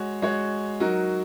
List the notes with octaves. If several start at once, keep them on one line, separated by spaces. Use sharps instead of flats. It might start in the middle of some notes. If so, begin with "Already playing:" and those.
Already playing: G#3 F#4 C#5
G#3 F#4 C#5
F#3 D#4 F#4 A#4